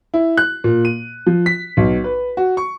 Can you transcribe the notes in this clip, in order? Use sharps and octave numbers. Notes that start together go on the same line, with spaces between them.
E4
F#6
A#2
D#7
F3
B6
B1
B4
F#4
C#6